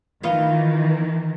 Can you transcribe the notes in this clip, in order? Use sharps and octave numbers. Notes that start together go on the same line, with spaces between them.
D#3 E3 B3 F4